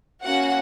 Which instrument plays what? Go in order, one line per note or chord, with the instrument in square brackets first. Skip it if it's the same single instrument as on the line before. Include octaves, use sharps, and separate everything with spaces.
[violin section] A#3 C#4 F#4 F#5